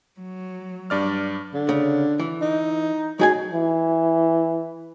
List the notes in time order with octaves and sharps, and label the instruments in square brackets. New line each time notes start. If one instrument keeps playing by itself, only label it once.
[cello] F#3
[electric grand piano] G2 D5 F6
[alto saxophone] D3
[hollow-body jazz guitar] C#3
E3
[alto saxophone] D#4
[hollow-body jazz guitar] F#3 G#4 G#5 [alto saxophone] D#4
[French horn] E3